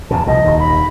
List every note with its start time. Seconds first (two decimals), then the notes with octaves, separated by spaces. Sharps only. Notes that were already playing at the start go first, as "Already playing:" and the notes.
0.11 E2 A#2 C#3 A5
0.26 C2 B2 F3 D#5
0.45 D#1 D#2 D#3
0.59 B5